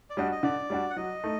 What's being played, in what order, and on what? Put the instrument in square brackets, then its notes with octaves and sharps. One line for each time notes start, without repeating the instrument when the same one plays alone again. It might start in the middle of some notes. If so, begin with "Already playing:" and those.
[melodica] D5
[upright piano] G3 D4 F#4 [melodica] D#5
[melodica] D#5
[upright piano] D3 [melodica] D5
[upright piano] G3 D4 F#4
[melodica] F#5
[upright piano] F#3 [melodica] D#5
[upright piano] A3 D#4